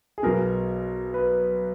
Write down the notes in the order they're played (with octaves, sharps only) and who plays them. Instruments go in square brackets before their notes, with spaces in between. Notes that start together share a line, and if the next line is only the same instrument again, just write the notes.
[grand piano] G#4
B1 B2 A#4
B4